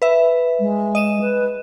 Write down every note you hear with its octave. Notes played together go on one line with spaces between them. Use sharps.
B4 E5
G#3
D#5 D#7 E7
B4